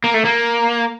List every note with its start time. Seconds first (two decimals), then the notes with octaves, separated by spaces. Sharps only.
0.04 A#3
0.14 A3
0.25 A#3